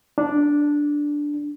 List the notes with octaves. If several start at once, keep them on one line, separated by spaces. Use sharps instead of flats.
D4